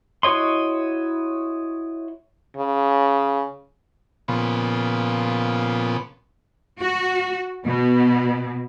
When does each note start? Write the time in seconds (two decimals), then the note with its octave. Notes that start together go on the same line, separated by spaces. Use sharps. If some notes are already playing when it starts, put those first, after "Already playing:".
0.23 E4 F#4 C#5 D#5 C6
2.57 C#3
4.28 A#2 C#3 F3 B3
6.79 F#4
7.65 B2